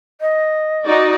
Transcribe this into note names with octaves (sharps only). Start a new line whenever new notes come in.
D#5
D#4 F#4 D5